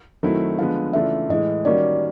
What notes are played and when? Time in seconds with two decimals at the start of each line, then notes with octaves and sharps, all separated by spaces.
0.23 D#3 F#3 A3 C4 E4
0.58 D3 F3 G#3 B3 F5
0.93 C#3 E3 A3 D4 F4 E5
1.29 A2 E3 G#3 D#5
1.65 D#3 G3 A#3 C#4 F#4 D5